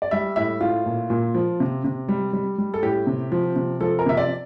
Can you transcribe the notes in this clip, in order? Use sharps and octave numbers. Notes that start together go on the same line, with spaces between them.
D5
G3 E5
A2 E5
A2 F4
A#2
A#2
F3
C3
C3
G3
G3
G3
A4
A2 G4
C3
F3
C3
F3 A4
A#4
C3 E5
D5